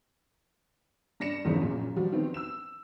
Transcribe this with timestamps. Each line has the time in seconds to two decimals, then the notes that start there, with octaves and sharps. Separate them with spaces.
1.20 G2 D5 A#6 C#7 E7
1.45 G1 E2 G#2 C#3 F3
1.61 F#2 A#2 C#4
1.96 F3 G3 F#4
2.12 D#3 B3 C4
2.34 E6 E7